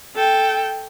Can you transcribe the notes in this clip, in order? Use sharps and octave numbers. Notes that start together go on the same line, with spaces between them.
A4 G5